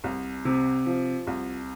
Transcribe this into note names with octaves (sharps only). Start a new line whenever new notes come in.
C2
C3
F3
C2